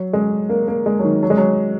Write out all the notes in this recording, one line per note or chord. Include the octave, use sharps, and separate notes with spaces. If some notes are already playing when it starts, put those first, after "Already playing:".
Already playing: F#3
G#3
A#3
A#3
G#3
F#3
D#3
F#3
G#3
F#3